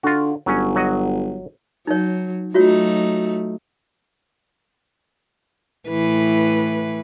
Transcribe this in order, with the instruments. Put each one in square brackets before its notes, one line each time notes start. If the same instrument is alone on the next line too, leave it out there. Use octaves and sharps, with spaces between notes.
[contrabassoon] D3 [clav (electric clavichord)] F4 F#4
[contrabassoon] G1 [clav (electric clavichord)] F#3 C#4
[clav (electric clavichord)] F#3 F#4 D#5
[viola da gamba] F#3 [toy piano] D#4 C#5
[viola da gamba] F#3 A3 D#4 [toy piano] F4 F#4 C#5
[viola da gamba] A2 E3 B4